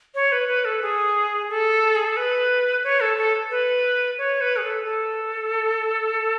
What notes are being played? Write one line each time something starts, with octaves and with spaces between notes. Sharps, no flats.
C#5
B4
B4
A4
G#4
A4
G#4
A4
B4
C#5
A4
A4
B4
C#5
B4
G#4
A4
A4